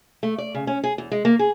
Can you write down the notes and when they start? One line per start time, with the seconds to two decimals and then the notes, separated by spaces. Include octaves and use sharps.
0.23 A3
0.38 D5
0.54 C#3
0.67 C#4
0.84 G#4
0.98 E2
1.12 G#3
1.25 A#3
1.39 G#4